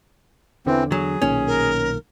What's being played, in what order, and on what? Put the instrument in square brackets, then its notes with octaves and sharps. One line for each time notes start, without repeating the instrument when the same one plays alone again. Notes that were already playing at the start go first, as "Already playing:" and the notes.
[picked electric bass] E2 D3 [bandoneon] E3 C4
[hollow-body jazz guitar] F#3 [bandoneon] G#4
[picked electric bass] B1 A#2 D#3 [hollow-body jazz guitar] C#4
[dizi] A#4